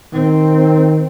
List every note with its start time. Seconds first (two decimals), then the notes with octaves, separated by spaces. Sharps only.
0.13 D#3 C4